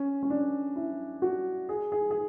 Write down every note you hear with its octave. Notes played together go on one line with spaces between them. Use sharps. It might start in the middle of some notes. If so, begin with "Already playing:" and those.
Already playing: C#4
C#4
D4
E4
F#4
G#4
G#4
G#4